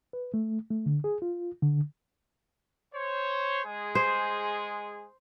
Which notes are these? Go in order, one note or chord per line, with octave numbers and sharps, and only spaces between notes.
B4
A3
A3
D3
G#4
F4
D3
C5 C#5
G#3 G#4
C5